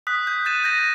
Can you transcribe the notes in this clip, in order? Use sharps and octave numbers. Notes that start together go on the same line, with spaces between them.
D#6 F#6 B6
G6
F#6 G6 A6 D#7 E7
G6 A#6 D#7